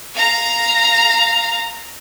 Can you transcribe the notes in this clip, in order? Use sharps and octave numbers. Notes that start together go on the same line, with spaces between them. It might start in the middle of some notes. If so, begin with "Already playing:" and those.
F5 A#5